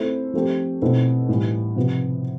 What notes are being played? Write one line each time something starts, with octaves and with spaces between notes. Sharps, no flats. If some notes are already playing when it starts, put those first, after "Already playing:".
Already playing: A3 C4 E4 A4 C5
F3 A3 C4 G4
B2 A3 C4 E4
A2 E3 G3
C3 F3 B3